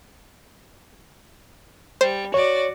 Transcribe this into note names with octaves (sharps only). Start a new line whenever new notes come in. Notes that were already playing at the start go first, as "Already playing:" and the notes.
G3 C5
F#4 C#5 D5